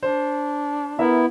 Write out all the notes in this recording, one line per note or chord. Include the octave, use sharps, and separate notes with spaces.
D4 C5
B3 E4 A#4 E5